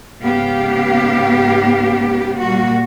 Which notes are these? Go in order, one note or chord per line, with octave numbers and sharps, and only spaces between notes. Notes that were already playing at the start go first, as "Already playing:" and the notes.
G#2 C#3 B3 G4 F5
A#2 G3 A#3 F#4